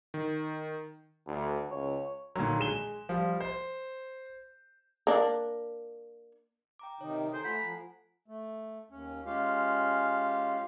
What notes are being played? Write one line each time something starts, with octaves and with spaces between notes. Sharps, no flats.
D#3
D2
C#2 C#5
A#2 D3 D#3 F#3
G#3 E7 G7
F3 G3
C5
A#3 D4
G5 A#5 D6
C3 D#3 D#4 C#5
A4 C5 G#5 A#5
A3 F4 F#5 G#5 A#5 B5
F3
A3
D#2 C#4
G#3 C#4 F4 G4 F5